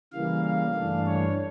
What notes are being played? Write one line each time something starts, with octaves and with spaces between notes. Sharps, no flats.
C#3 E3 G3 A#3 F5
F5
G2 E3 A3 D4
C#5